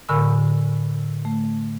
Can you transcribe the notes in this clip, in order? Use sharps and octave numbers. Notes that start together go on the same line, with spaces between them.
A2 D3 A#4 G#5 B5 E6
A3